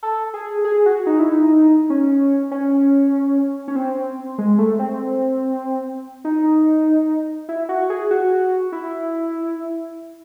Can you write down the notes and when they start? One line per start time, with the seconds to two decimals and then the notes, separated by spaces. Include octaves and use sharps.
0.03 A4
0.34 G#4
0.65 G#4
0.86 F#4
1.06 D#4
1.19 E4
1.32 D#4
1.90 C#4
2.51 C#4
3.68 C#4
3.76 C4
4.38 G#3
4.58 A3
4.79 C4
6.25 D#4
7.49 E4
7.69 F#4
7.90 G#4
8.11 F#4
8.72 E4